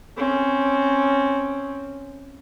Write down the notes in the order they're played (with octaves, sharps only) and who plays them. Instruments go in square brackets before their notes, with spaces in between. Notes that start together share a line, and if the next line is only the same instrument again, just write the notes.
[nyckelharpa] C4 C#4